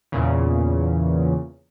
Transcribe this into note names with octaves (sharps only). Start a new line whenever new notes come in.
E2 A#2 C#3